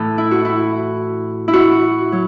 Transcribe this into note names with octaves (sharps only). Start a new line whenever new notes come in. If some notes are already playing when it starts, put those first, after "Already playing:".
Already playing: A2 E3 A4
E4
F#4
E4
E4
F#4
F#3